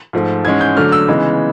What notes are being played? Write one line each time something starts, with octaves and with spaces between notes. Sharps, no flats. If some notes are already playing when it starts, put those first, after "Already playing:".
G#2 F3 A3
G#2 E3 G#3 C#4 G#6
G6
D3 F#3 A3 D4 F6
E6
C#3 E3 G#3 B3 D#4